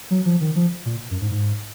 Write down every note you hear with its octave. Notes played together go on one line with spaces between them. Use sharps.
F#3
F3
D#3
F3
A#2
F#2
G#2
G#2